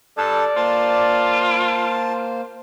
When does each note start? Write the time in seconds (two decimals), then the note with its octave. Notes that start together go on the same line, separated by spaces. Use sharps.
0.18 G2 A4 D5 A5
0.56 A#3 F4 C5 A5